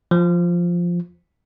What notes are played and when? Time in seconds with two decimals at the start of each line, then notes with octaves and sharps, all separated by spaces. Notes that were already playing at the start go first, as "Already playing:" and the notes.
0.11 F3